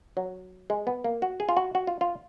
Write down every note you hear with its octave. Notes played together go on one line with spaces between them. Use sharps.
F#3
G#3
B3
A#3
F#4
G#4
F4
F#4
F#4
F4
F4